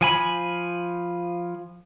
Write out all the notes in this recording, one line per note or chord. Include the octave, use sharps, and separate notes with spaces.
F3 G#5 B5